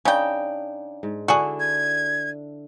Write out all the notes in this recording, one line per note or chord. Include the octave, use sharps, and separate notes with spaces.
C#3 D4 D#4 G5
G#2
D3 D4 E4 F#4 G#4
G#6